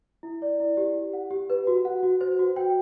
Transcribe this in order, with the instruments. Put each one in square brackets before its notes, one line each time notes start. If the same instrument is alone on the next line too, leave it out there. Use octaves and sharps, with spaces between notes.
[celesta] E4
D5
E4
G4
G4
F#5
G4
B4
F#4
F#5
F#4
C5
F#4
G5